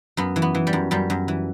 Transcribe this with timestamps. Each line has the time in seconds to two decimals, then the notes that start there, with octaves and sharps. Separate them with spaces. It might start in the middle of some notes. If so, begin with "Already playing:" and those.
0.17 F#2 B3
0.36 E3
0.42 B3
0.55 E3
0.67 G3
0.73 F#2
0.91 F#2 G3
1.10 F#2
1.28 E3